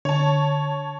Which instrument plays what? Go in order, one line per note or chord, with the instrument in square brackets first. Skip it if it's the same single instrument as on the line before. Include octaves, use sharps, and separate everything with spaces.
[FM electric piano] D3 [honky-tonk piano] C#5 A5